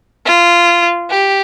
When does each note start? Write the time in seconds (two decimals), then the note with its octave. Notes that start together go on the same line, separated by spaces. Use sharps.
0.25 F4
1.10 G4